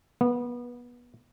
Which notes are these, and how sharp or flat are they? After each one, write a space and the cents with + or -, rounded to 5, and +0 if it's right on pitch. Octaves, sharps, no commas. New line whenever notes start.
B3 -25